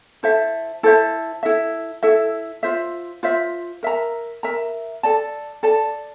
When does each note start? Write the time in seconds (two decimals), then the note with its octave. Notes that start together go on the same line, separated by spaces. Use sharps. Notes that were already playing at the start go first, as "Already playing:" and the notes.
0.23 E4 A4 C5 E5
0.83 E4 A4 C5 E5
1.43 E4 A4 E5
2.03 E4 A4 E5
2.63 F4 C5 E5
3.23 F4 C5 E5
3.83 A#4 E5 A#5
4.43 A#4 E5 A#5
5.03 A4 D5 A5
5.63 A4 D5 A5